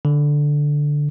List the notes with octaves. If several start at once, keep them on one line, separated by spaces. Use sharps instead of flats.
D3